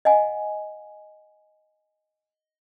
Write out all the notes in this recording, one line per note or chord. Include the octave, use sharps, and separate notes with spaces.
D#5 F#5 G#5